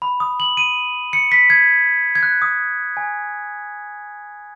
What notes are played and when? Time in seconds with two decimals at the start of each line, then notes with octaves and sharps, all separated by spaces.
0.02 B5
0.20 D#6
0.40 F#7
0.57 D#7
1.13 C#7
1.32 B6
1.50 G#6
2.15 G#6
2.23 F#6
2.42 D#6
2.97 G#5